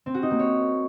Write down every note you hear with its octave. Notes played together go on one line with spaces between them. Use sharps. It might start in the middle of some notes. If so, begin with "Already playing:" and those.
C4
F#4
D#4
A#3
C#5